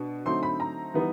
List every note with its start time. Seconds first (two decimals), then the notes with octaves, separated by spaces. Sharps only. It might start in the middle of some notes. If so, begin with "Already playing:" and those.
Already playing: B2 B3 D4
0.26 D3 F#3 A3 C4 D#4 C6
0.43 B5
0.60 A#5
0.94 E3 G3 B3 D#4